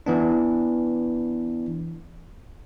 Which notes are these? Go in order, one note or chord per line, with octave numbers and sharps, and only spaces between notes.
E3 B3 D4